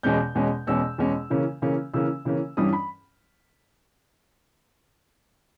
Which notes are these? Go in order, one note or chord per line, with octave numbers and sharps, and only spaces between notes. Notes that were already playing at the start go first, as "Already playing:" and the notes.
E2 B2 G#3 C#4 G6
E2 B2 G#3 C#4
E2 B2 G#3 C#4 E6
E2 B2 G#3 C#4
C#3 E3 A#3 C#4
C#3 E3 A#3 C#4
C#3 E3 A#3 C#4 E6
C#3 E3 A#3 C#4
G2 E3 G3 C#4 D#6
B5